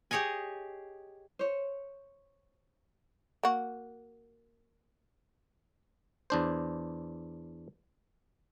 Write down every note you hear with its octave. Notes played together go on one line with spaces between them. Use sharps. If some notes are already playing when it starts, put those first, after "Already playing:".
G4 G#4 C#5 D#5 G#5
C5 C#5
A#3 F#4
E2 D4 C5